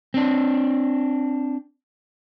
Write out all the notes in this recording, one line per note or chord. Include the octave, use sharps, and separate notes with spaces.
C4 D4